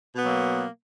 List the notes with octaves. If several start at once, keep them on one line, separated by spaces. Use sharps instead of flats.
B2 F#3 A#3 B3